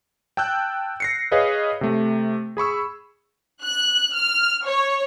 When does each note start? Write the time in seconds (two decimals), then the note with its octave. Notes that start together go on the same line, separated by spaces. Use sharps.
0.37 G5 A5 E6 F#6 G6
1.00 A#6 C7 C#7
1.31 G#4 B4 C#5 D#5 F5
1.81 C3 A3
2.57 G#4 B5 C#6 E6
3.63 F#6
4.14 F6
4.65 C#5